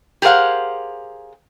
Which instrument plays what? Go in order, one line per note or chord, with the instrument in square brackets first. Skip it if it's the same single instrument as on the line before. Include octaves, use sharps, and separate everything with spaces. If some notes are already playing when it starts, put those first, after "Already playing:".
[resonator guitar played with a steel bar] G4 G#4 A#4 C5 F5 F#5